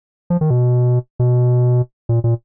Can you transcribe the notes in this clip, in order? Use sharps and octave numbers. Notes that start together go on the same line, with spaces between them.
F3
D#3
B2
B2
A#2
A#2